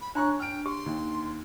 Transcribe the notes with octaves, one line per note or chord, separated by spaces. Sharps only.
B5
D4 C#5 A#5 C#6 F#6
G5 F6 D7
G4 C6
D#2